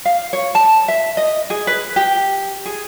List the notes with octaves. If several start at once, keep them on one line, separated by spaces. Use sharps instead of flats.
F5
C#5
A5
E5
D#5
G#4
B4
G4
G#4